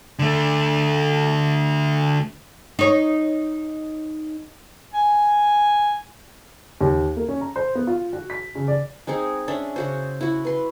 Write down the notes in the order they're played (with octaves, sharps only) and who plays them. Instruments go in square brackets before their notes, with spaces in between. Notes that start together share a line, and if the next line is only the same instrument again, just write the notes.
[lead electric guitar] D3 A3
[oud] D#4 C#5
[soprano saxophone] G#5
[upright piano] D#2
A#3
C#4
A#5
C5
B3
F4
F#4
B6
C#3
D5
[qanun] G#3 C4 D#4 G#4
C#4 D4 E5
C#3 F#4 C5
E4 F#4
B4 C6